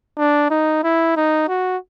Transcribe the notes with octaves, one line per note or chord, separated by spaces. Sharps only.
D4
D#4
E4
D#4
F#4